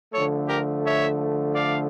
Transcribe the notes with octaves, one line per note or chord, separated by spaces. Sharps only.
D3 F3 A3 A4 C#5
G4 A#4
C#5 E5
D5 F5